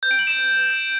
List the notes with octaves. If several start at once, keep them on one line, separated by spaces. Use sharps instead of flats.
G6
D7
F#7
E7